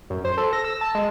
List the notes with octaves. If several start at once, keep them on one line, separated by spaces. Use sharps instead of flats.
F#2
C5
A4
A#6
E6
A5
G#3